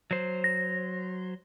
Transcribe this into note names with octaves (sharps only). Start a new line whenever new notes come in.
F#3 C5
A#6